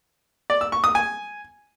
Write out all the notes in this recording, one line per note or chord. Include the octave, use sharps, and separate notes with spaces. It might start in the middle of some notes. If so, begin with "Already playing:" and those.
D5
E6
C#6
D#6
G#5